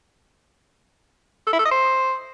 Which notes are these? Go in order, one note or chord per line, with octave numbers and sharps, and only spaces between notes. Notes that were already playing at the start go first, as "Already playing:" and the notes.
A4
E4
A4
D#5
C5